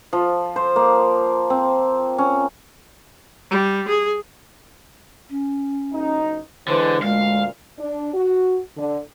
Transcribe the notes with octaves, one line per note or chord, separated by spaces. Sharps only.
F3
C5
A#3
C4
C#4
G3
G#4
C#4
F#1 D#4
D3 E3 G#3 B4 C5
D2 A#2 G#3 F5
D4
F#4
D3